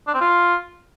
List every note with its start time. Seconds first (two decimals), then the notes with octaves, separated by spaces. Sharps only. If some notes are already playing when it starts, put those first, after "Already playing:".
0.08 D4
0.14 C4
0.21 F4